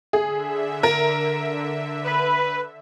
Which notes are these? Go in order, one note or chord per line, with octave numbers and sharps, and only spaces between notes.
D3 G#4 E5
A#4
B4